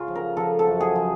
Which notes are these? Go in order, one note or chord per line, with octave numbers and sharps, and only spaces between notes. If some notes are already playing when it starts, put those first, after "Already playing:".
Already playing: C#3 F4
F3
A#4
F3 A4
A4
F#2
G#4
F3